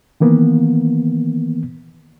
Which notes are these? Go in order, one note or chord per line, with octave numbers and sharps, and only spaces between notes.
D#3 E3 A#3 B3